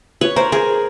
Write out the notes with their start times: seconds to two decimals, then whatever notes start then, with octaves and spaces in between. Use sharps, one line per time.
0.21 B4 C#5
0.36 A#4 C5
0.52 G#4 A#4